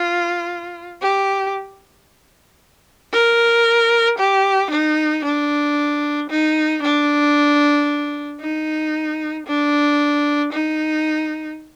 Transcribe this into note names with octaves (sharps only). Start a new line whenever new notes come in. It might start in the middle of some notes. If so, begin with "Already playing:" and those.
Already playing: F4
G4
A#4
G4
D#4
D4
D#4
D4
D#4
D4
D#4